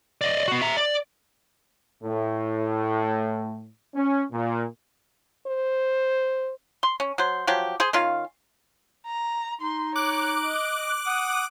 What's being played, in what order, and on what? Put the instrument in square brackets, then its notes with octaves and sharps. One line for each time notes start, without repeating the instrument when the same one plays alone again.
[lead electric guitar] D5 D#5
B3 F#4
E5 A#5
D5
[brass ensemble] A2
C#4
A#2
[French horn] C5
[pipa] C6
C#4
F#3 C5
F3 F#3 G4
G#4 C5
D#3 C#4 F4 F5
[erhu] A#5
[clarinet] D#4 [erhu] C6
[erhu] C#5 [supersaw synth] D6 F#6
[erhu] D#5
[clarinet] F#5 [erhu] D#6